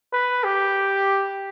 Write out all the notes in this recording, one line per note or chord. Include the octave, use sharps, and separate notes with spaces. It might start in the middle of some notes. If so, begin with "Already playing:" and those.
B4
G4